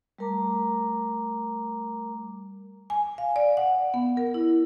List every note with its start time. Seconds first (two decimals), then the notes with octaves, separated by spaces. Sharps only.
0.18 G3 A3 A#4 A#5 D6
2.90 G#5
3.18 F5
3.36 D5
3.57 F#5
3.94 B3
4.17 A#4
4.34 E4